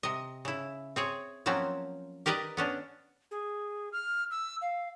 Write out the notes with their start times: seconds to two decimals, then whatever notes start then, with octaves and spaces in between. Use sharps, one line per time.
0.03 C3 D#5
0.45 C#3 E4
0.96 C4 G#4 C#5
1.46 F3 F#3 A#3 C4 C#4
2.26 G4 A#4 B4 D5 D#5
2.57 B3 C#4 D4
3.31 G#4
3.93 F6
4.31 E6
4.62 F5